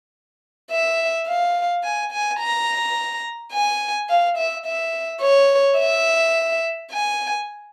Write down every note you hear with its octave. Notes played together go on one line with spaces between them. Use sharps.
E5
F5
G#5
G#5
A#5
G#5
F5
E5
E5
C#5
E5
G#5